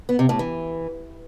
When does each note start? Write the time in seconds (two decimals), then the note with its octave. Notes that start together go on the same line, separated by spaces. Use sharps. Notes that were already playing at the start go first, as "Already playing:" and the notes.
0.09 B3
0.19 C3
0.29 A2
0.39 E3